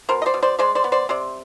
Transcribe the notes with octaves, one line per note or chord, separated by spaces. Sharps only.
B2 A#4 C5
D#5
C5 D5
B2
C5 D5
G#3 C5 D5
C5 D5
B3
C5 D5
C3 C5 D5